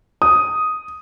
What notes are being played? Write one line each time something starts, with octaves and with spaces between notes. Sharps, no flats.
D#6